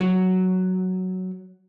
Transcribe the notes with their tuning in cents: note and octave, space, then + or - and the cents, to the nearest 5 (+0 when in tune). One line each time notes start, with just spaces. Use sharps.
F#3 +5